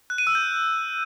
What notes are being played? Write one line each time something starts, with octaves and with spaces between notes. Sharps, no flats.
F#6
D#7
E6
G6